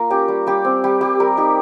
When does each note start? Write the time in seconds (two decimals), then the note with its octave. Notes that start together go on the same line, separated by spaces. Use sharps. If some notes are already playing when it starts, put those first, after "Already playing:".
Already playing: A#3 F4 A#4
0.10 C#4 G4
0.28 G3
0.47 G3 G4
0.65 C4
0.84 G3 G4
1.01 G3 G4
1.20 G3 A#4
1.37 D#4 G4